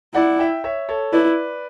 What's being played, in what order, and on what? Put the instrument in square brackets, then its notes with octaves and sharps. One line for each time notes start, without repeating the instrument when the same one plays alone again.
[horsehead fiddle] E4 [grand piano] D5 F#5
[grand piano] E5 G5
C#5 E5
A4 C#5
[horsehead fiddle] E4 [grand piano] B4 D5